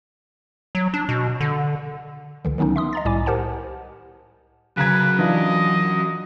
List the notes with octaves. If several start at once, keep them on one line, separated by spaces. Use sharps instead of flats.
F#3
D4
B2
D3
C#2 D3 E3
D#3 F#3 B3 C#4 D#4
E5 C6 D#6
D#5 A#5 A6
C2 A2 E4 D5 G#5 D6
G4 A#4 C5 F#5 A5
F#2 C#3 F#3 B4 A#5 G#6
E3 D4 F4 D#5